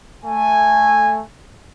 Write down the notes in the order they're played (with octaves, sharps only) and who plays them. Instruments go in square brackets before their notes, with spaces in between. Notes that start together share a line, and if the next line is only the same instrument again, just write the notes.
[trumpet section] A3 G#5